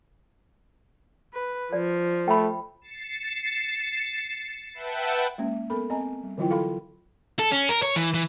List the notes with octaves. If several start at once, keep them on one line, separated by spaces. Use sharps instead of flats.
B4
F3 D5
A3 G5 B5
A6 C7 C#7 E7
B4 E5 F#5 G5 A5
G#3 A#3 C#4
B3 A4 A#4 B5
C4 D#5 G#5 A#5
G3
D3 E3 F#3 E4 F4 G5
F4 A4 F5 B5 C6
A4
C#4
A#4
C#5
E3
E3